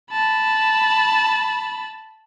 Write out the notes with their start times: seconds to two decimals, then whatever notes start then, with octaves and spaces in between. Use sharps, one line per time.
0.12 A5 B5